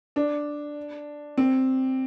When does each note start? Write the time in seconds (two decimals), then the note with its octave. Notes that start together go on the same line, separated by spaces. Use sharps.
0.16 D4
1.37 C4